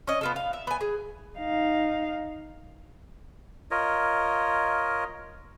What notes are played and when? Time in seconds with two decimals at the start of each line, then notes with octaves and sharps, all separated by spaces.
0.07 C#4 D#5
0.21 B3 F4 A4
0.36 F5
0.53 E5
0.67 B3 G#5
0.81 G#4
1.37 D#4 F5
3.71 F4 A#4 C#5 D#5